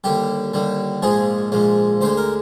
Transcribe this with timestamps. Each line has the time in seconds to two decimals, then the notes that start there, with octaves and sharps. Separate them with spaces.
0.04 D#2 D3 G3 G4
0.54 D#2 D3 G3
1.02 A#1 G#2 F3 G#3 G#4
1.52 A#1 G#2 F3 G#3
2.01 D2 D3 G#3 C5
2.17 A#4